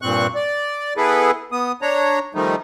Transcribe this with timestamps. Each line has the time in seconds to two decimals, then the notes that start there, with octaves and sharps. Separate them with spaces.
0.02 G2 A#2 C4 C#6 F#6
0.35 D5
0.97 B3 E4 G#4 A4 B4
1.52 B3 D#6
1.82 D4 C#5 A#5
2.35 D#3 F3 G3 A3 D#4